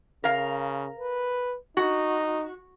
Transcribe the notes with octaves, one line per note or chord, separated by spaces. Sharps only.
C#3 A#4 F5
B4
D#4 F#4